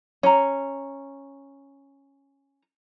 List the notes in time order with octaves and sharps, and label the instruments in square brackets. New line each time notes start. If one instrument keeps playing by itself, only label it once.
[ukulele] C#4 A#5